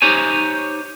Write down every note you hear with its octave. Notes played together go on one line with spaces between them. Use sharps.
D#4 G4 C5 C#5 G#5